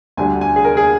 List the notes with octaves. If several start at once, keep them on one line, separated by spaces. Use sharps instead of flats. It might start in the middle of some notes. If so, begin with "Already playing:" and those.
D2 D3 G3 D4 G#5
G#5
G#4
A#4
G#4